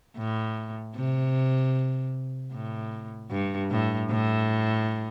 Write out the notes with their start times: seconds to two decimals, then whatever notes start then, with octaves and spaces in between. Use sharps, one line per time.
0.17 A2
0.95 C3
2.53 A2
3.31 G2
3.70 A2
4.10 A2